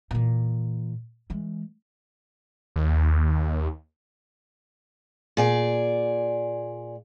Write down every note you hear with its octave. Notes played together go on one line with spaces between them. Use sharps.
A#2 E3
E3 G#3
D#2
A#2 G#4 D5